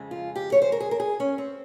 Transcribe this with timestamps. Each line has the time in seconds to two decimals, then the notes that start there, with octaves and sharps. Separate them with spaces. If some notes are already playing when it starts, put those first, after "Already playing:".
Already playing: F2 C#3 G#3
0.11 F4
0.36 G4
0.52 C#5
0.62 C5
0.72 A#4
0.80 G#4
0.91 A#4
1.00 G#4
1.20 C#4
1.38 C4